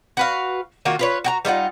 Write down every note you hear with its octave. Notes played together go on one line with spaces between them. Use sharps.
F#4 B4 F5
D#3 A#3 F4 F#4
F4 B4 C#5
F#4 G5 A#5
G3 D#4 F4 F#5